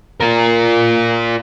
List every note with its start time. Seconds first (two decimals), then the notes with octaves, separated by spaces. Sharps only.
0.21 F4 A#4